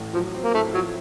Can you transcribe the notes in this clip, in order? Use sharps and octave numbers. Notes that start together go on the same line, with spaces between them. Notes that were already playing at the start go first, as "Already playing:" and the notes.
Already playing: A1 A2
F3 F#3
C4
A#3
A2 A3
F3 F#3